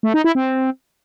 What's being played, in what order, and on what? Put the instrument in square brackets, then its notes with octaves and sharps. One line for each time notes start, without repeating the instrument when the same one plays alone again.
[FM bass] A3
D#4
E4
C4